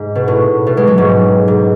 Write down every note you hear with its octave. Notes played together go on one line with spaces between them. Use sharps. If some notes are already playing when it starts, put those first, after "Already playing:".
Already playing: G#2
B2
A2
B2
G#3
F#3
G#2
G#2